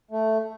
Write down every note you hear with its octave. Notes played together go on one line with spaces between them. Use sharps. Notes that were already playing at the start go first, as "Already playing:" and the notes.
A3